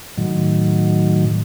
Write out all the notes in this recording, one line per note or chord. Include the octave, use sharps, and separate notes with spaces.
A2 D#3 F#3